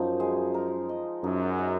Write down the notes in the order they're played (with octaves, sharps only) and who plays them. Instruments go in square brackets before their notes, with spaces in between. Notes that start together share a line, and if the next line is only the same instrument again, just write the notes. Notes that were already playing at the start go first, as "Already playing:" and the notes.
Already playing: [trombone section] F#2 [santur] F3 D#4
[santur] G#3
A#4
D#5
[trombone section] F#2 [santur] D#4
[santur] D#4